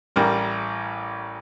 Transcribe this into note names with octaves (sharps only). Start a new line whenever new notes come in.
A1 G3 A#4